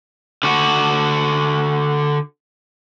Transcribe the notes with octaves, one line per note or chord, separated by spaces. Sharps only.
D3 F#4